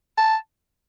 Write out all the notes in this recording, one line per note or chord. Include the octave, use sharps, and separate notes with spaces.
A5